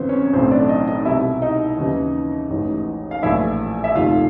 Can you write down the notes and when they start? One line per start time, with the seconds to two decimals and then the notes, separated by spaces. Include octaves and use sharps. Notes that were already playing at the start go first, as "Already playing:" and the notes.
Already playing: G#1 F#2 C#3 E3 B3 C4 C5
0.09 C#4 C#5
0.33 B1 A2 E3 C4 C5
0.51 D4 D5
0.69 D#4 D#5
0.87 D#4 D#5
1.05 C2 B2 E4 E5
1.42 D#4 D#5
1.78 D#2 C#3 E3
2.50 A1 G#2 E3
3.11 F5
3.23 A#1 A2 E3 E4 E5
3.84 E5
3.95 F1 D#2 D#3 F4 F5